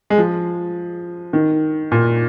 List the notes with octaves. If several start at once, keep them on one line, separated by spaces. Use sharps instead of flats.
G#3
F3
D#3
A#2